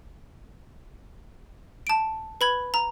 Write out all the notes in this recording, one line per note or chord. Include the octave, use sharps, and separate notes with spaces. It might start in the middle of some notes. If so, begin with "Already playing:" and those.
A5 D7
B4 B5 G#6
A#5